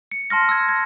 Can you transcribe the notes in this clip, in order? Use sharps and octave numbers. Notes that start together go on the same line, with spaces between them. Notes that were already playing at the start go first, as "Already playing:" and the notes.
C#7
A5 C6 F6 A#6
E6 G#6
G#6